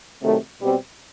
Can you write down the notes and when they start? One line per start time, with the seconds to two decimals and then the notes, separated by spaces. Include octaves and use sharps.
0.21 C3 D#3 F#3 A3
0.60 B2 G3 C4